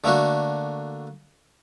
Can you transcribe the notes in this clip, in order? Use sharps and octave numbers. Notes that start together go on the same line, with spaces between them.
D3 A3 A#3 D4 F#4